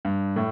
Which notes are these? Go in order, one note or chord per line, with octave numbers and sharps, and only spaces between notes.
G2
A2